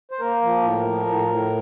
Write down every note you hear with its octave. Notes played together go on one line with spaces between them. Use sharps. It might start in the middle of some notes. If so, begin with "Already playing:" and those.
C5
A#3 A#4
F3
A2
F3
A2
A2